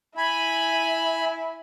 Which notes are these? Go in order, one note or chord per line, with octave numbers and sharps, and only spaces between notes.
E4 G#5 B5